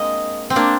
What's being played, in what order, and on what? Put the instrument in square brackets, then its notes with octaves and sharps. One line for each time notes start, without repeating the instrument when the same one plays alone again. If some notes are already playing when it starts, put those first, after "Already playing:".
Already playing: [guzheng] G#3 A#3 C4 D4 [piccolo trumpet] D#5
[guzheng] C4
A#3 D4